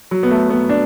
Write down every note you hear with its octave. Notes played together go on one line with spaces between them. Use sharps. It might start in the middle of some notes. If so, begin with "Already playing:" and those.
F#3
B3
A3
B3
D4